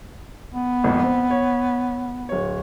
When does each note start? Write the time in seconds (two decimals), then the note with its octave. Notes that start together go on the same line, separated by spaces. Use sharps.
0.52 B3
0.84 G#1 F2 A#2
1.03 C4
1.31 C#5
2.29 D1 C#5